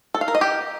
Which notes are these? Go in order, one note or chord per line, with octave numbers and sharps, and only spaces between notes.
A4
F5
A#4
D#5
G4